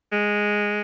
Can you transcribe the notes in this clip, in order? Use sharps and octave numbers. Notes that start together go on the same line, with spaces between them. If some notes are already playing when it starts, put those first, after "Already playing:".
G#3